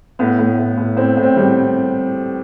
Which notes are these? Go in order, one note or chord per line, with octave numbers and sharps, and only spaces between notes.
A2 B3
A2
A2
A2
A2 C4
A2
C4
G3